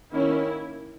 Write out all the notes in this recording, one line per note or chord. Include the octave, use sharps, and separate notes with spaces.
D#3 A#3 C#4 E4